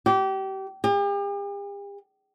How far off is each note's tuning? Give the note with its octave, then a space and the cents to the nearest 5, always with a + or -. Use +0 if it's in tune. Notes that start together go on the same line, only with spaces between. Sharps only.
G4 -30
G4 +45